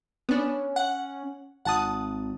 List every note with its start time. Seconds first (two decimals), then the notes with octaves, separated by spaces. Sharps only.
0.29 B3 C#4 D4
0.76 F#5
1.65 G#1 F#5 A5 D#6